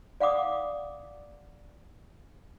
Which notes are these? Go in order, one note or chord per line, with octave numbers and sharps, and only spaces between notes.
D5 F5 F#5 D6 D#6